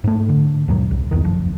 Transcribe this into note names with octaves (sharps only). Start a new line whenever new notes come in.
G#2 A3
D3
D#2 G#2 B2 F#3
C2
E1 A1 E2 D#3
F#1 F3